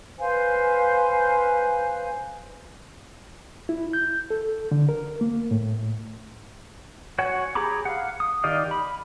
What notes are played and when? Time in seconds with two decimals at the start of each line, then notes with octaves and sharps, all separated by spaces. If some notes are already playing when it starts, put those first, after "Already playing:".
0.19 B4 C5 F5 G#5
3.69 E4
3.93 G6
4.30 A4
4.71 D3
4.89 A#4
5.21 A#3
5.51 A2
7.19 F#4 C#5 F#5 G#5
7.55 G4 G#4 A#5 B5 D6
7.85 F5 F#5
8.20 D#6
8.44 D#3 G4 D5 D#5 F5
8.71 B5